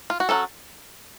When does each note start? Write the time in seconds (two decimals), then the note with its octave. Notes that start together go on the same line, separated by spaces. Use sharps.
0.10 F4
0.20 F#4
0.29 F#3 A#3 C#4 A4